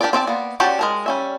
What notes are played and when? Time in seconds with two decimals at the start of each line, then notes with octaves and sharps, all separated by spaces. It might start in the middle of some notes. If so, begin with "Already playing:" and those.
0.01 D4 G4 A#4 D5
0.13 C4 D5 E5 A5
0.27 A#3 B3
0.60 C#4 F#4 G4 D5 A5
0.79 G#3 A#4 A5
1.06 G3 C#4 E5